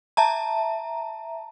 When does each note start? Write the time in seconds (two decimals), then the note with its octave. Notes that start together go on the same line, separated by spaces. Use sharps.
0.17 E5 A5 A#5